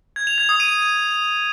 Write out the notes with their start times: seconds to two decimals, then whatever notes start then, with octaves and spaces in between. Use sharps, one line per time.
0.16 G#6
0.27 F7
0.38 G#6
0.49 D#6
0.60 D#7